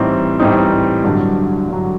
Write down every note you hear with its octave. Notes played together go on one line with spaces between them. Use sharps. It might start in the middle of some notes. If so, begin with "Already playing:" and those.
Already playing: A2 E3 G3 C4 D#4
A2 E3 G3 C4 D#4
G2 D3 F#3
G2 D3 F#3